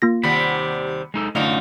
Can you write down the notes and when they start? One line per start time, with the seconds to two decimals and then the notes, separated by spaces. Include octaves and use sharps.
0.02 A#3 F4 A#6
0.23 D#2 C3 G3 F#5 B5
1.14 G#3 D#4 A4
1.35 F#2 D3 A3 C#4 D#4 F4